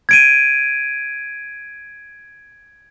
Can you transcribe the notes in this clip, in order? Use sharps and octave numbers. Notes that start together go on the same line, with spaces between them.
G#6 D7 D#7